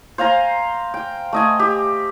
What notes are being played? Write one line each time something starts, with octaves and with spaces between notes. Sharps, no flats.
C5 F5 G#5 A#5
G5
A3 D#5 G#5
G4